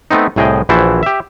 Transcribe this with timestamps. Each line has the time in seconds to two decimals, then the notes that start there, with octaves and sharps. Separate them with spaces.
0.11 A3 B3 C4 D#4
0.36 C2 A2 G#4 D#5 G5
0.69 A#1 E3 E4 F#4 C5 A5
1.03 G4 E5